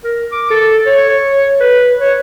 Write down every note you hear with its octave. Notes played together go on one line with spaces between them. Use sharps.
A#4
D6
A4
C#5
B4
C#5